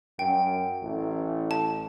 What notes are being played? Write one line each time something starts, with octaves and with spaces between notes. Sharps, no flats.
F#2 G5
A1
A5